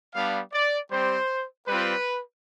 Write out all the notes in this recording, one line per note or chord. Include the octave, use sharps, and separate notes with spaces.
G3 B3 D4 F5
D5
G3 C4 G4 C5
G3 C4 F4 B4